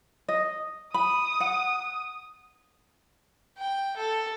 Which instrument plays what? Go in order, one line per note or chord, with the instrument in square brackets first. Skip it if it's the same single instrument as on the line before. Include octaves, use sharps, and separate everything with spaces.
[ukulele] D#5
[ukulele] B5 [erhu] D#6
[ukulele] F#5
[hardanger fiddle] G5
A4